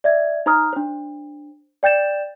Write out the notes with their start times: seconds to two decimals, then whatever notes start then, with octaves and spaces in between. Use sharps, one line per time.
0.04 D5 E5 G#6
0.46 D#4 C5 A#5 D#6 F6
0.73 D4 C5
1.83 D5 G5 G6 A6 E7